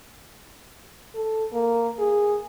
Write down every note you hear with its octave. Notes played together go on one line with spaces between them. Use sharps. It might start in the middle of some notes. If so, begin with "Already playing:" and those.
A4
A#3
G#4